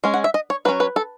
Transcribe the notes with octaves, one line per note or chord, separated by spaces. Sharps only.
G#3 C#4
F#5
E5
D#5
C#5
F#3 C#4 B4
B4
A4